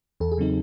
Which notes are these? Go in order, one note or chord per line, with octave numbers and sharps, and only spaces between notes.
E2 A4
G#4
C#3 F#3 C4 D#4